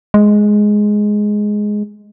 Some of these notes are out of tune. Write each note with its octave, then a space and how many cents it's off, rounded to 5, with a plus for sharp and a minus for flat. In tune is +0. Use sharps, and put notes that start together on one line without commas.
G#3 +5